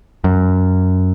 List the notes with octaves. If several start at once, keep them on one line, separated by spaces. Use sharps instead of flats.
F#2